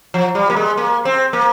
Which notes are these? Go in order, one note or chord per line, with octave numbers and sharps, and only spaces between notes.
F3
G3
A#3
G#3
A#3
C4
A#3